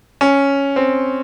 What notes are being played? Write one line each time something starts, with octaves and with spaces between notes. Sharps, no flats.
C#4
C4